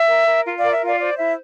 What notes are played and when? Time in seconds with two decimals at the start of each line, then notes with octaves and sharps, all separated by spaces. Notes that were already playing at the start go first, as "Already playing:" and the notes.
Already playing: E5
0.08 A#4
0.27 A#4
0.45 F4
0.58 A#4 D5 F5
0.72 E5
0.81 F4 D5 F5
1.00 C5 D5
1.18 E4 E5